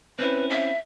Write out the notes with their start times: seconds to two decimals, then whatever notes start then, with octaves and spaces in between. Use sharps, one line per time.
0.19 C4 C#4 E4 B4
0.50 E5